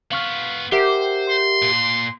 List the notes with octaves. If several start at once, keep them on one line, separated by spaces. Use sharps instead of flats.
B3 F4 F5 C#6 F6
G4 A#4 C5 E5 F#5
C6
A#2